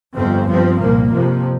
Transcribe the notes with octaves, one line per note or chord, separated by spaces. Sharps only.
G1 F2 F3 C4
G2 F3 C4
C2 A#2 F3 A#3
F2 C3 F3